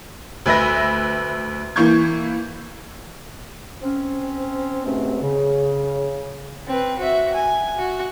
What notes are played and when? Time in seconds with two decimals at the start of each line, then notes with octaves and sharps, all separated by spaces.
0.46 D2 B4 E5 B5 A#6
1.76 E3 A#3 E4 C#6 G6 G#6
3.83 C4 C#4
4.85 D#2 G#2 B2 A3 C4
5.22 C#3
6.67 C4 B4
6.98 F#4 E5
7.34 G#5
7.78 F#4